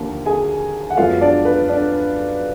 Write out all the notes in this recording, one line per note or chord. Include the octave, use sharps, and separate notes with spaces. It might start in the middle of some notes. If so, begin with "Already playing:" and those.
Already playing: D#2 D3 F3 A#3
G#4 G#5
F#5
F#2 F3 G#3 B3 F4 F5
D4 D5
B4
D4 D5